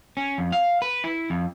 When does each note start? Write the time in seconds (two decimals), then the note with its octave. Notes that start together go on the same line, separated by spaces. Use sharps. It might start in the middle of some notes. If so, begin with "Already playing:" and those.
0.17 C#4
0.38 F2
0.52 F5
0.82 B4
1.04 E4
1.30 F2